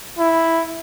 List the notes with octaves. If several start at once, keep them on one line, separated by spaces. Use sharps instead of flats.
E4